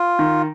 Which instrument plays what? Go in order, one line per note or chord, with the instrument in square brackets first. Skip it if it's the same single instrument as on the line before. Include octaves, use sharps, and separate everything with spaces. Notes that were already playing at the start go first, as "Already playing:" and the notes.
Already playing: [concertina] F4
[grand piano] D#3